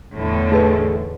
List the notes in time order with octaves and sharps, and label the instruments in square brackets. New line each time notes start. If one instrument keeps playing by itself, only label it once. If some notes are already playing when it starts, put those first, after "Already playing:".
[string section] E2 A2 D3
[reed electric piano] A3 G#4 A4 [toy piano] D#4 B4 D#5